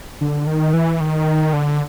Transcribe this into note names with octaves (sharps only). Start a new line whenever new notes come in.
D3
D#3
E3
D#3
D3